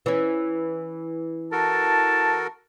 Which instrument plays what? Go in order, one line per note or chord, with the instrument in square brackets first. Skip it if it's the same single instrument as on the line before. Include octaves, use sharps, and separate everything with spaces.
[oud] E3 C#4
[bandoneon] F#4 A4 A#4 [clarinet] A5